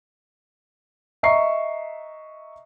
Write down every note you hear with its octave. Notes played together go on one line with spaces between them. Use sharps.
D#5 E5 A#5 C#6 C7